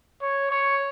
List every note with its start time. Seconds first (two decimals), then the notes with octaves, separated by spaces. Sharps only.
0.22 C#5
0.51 C#5